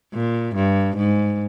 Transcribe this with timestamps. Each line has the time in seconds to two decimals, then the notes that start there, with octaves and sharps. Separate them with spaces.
0.14 A#2
0.55 G2
0.97 G#2